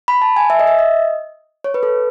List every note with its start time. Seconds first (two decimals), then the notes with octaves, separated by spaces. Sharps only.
0.08 B5
0.22 A5
0.36 G#5
0.50 E5
0.60 D#5
0.67 E5
0.79 D#5
1.64 C#5
1.74 B4
1.83 A4